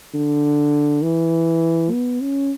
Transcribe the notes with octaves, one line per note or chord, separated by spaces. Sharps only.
D3
E3
B3
C#4